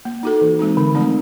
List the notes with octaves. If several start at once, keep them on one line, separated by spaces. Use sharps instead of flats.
A#3
D#4 F#4 A4
E3
G#3 C4 D#4
D3
F3 A3 C4 D#4